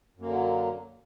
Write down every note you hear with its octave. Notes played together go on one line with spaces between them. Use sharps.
F#2 D3 F#3 A#3